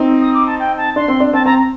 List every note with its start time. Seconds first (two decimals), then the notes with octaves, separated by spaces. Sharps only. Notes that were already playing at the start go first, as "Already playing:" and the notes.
Already playing: C4 D#4
0.21 D#6
0.34 D6
0.47 A5
0.59 G5
0.77 A5
0.96 D4 C6
1.08 C4
1.20 D4
1.33 C4 A5
1.45 C4 A#5